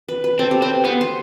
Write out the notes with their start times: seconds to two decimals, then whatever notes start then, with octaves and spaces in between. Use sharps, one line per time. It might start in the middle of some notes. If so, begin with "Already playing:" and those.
0.08 B4
0.24 B4
0.39 C4 A4
0.51 G4
0.62 C4 B4
0.84 B3 C5
1.01 C5